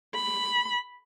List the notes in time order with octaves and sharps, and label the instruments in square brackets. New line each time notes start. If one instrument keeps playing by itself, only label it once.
[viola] B5